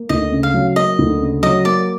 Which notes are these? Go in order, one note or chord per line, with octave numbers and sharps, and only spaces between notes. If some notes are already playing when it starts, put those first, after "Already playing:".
Already playing: A#3
D2 D#5
C#3
F5
F#3
A#3 D#5
D2
C#3
F#3 D#5
A#3 D5